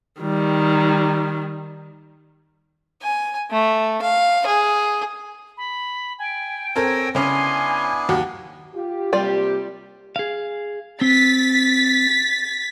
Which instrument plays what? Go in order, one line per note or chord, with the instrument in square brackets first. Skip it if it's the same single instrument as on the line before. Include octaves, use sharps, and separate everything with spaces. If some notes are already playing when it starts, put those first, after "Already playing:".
[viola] D#3 G3
[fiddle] G#5
A3
F5
G#4
[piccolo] B5
[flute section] G5 [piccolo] G#5
[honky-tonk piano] C4 A4 A#4 [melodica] C#5 G#5 E6 [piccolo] A#6
[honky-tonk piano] C#3 C#4 [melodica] B3 D4 E4 [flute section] G#5 [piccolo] C6
[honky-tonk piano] D#2 F#3 F#4
[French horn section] F4 G4
[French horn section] C3 A#3 G4 [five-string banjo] G3 F4 D5
[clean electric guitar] G#4 F5
[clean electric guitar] C4 [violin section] A6 B6